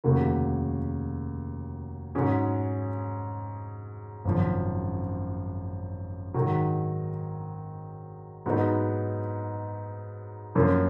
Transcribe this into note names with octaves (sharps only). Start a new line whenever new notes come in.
F1 D#2 C#3 F#3 A#3
G#2 F#3 C#4 G#4
G#1 F#2 F3
G#2 D#3 F#3
G#2 F#3 B3 D#4
F#2 F3 A#3 C#4 F4